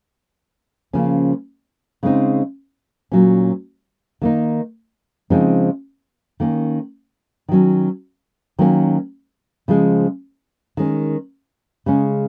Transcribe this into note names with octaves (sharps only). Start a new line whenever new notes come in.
C#3 F3 A#3 C#4
C#3 G#3 C4 D#4
A#2 F#3 C#4
D#3 A#3 D#4
C#3 F3 G#3 C4 D#4
D#3 A#3 C#4
D#3 F#3 C#4
D#3 F#3 A#3 C#4
C#3 F3 G#3
D#3 G#3 C#4
C#3 G#3 C#4